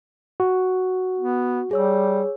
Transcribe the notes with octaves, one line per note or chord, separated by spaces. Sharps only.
F#4
B3
G3 G#4 C#5 E6